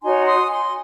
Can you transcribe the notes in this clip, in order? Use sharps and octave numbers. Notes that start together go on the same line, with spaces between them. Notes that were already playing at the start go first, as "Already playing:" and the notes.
D#4 F#4 C#5 G#5 C6
C6 D#6
G#5 C6